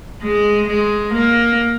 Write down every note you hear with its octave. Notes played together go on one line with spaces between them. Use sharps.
G#3
G#3
A#3